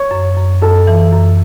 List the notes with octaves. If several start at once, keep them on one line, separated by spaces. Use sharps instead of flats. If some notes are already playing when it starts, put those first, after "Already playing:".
Already playing: C#5
F#2
F#2
F#2 A4
E3
F#2